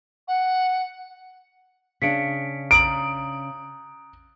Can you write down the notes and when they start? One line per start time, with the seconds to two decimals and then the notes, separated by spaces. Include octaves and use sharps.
0.28 F#5
2.02 C#3 D4 B6 C#7 D7
2.71 A#5 D#6 D7 F#7